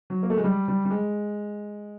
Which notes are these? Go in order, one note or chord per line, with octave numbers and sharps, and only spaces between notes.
F#3
A#3
A3
G#3
G3
G3
G3
G#3